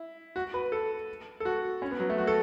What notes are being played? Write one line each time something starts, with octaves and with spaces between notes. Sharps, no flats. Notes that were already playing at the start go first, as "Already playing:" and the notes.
Already playing: E4
F#4
B4
A4
A4
F#4
C#4
B3
F#3
A3
F#4
A4